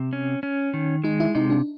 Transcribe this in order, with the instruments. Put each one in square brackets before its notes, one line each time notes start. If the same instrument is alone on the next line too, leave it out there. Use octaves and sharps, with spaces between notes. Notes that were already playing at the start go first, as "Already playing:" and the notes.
Already playing: [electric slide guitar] C3
C#4
C#4
D#3
[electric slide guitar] G#3 [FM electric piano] D#4
[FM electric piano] E4
[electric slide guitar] C3 [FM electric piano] D#4
[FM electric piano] D4